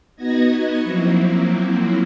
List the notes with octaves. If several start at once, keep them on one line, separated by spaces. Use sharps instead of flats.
B3 D#4 F#4 D#5 G#6 A#6
F3 F#3 A#3 C4 E4